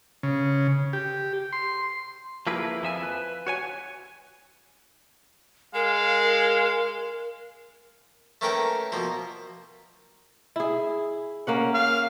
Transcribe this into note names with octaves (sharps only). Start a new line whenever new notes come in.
C#3
G4
C6
F3 A#3 E4 G#4 B4
F2 F3 E5 G#5
B4
F#4 C#5 G#5
G#3 A#4 F5
A3 A#3 C#4 A#4 B4 G5
B2 F3 A#3
E4 G#4
A#3 C#4 F#5
F5